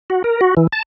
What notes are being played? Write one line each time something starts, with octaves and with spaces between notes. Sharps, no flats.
F#4
A#4
F#4
E3
A5